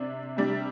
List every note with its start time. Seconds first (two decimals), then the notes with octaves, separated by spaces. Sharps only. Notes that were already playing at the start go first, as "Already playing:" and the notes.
Already playing: C3 D4
0.37 C3 G3 D4